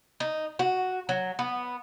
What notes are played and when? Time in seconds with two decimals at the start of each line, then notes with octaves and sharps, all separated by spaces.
0.20 D#4
0.59 F#4
1.09 F#3
1.39 B3